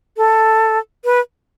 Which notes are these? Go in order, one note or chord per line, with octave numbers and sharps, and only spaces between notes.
A4
B4